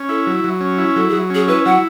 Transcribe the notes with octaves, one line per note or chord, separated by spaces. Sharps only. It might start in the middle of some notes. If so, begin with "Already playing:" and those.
Already playing: C#4
E4 A4
F#3
F#3
C#4
E4
F#3 A4
F#3 G#4
C#4 G#4
E4 B4
F#3 F#5